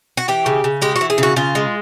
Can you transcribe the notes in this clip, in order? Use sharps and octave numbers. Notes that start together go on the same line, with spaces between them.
F#4
E3 G4
C#3
C#3
G#3 G4
F#4
E3
G#4
C#3 F#4
C#3 F4
G#3